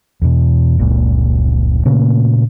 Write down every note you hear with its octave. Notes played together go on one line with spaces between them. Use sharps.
E2 B2
F1 C#2 A#2
A#2 C#3 A3 A#3